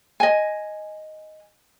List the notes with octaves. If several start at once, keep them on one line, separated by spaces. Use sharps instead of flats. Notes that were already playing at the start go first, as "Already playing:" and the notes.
D#5 G#5